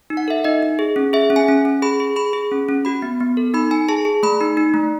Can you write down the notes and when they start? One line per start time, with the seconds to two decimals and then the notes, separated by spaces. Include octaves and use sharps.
0.10 D#4
0.17 F#5
0.28 A4 E5
0.44 D#4 D#5
0.63 D#4
0.79 G#4
0.96 C#4
1.13 G#4 E5
1.30 C#4
1.36 G#5
1.48 C#4
1.65 C#4
1.82 G#4 B5
2.00 G#4
2.16 G#4 B5
2.33 G#4
2.51 C#4
2.69 C#4
2.85 F#4 B5
3.02 B3
3.20 B3
3.37 A4
3.54 D#4 B5
3.71 D#4 G#5
3.89 G#4 A5
4.05 G#4
4.23 A3 B5
4.41 D#4
4.57 D#4
4.74 A3